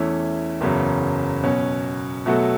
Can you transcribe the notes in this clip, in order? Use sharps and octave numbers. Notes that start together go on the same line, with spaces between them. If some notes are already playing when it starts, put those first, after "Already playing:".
Already playing: E2 E3 A3 C#4 E4
F#1 E2 C#3 F#3 C#4
B2 F#3 C#4
B2 F#3 A3 F#4 A4